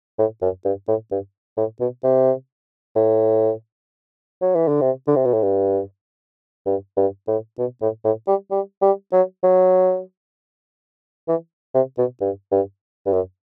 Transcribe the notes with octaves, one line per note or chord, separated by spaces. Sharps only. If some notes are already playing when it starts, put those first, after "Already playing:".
A2
F#2
G2
A2
G2
A2
B2
C3
A2
F#3
E3
D3
C3
D3
C3
B2
A2
G2
G2
G2
A2
B2
A2
A2
G3
G3
G3
F#3
F#3
E3
C3
B2
G2
G2
G2
F#2